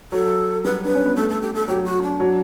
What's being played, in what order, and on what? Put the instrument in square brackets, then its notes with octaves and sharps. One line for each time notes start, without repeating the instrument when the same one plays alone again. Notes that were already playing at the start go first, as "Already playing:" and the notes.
[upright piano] F#3 [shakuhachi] A4
[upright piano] G3 [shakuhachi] B4
[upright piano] D4 [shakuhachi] B4
[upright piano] C#4
B3
[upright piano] A3 [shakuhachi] A4
[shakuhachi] A4
G4
A4
[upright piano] F#3 [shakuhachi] G4
[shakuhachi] F#4
D4
[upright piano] F#3